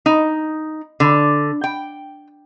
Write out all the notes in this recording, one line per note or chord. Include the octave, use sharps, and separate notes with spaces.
D#4
D3
G5